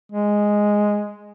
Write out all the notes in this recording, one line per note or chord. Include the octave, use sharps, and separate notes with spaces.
G#3